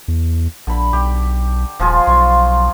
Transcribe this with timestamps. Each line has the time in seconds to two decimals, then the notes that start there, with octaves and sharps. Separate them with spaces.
0.08 E2
0.67 A#1 D3 B5
0.93 B1 G4
1.80 D#1 F3 F4 G#4
2.07 B1 C6 C#6